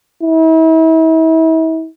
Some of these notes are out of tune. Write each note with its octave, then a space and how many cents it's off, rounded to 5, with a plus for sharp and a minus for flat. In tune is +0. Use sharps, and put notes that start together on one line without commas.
E4 -40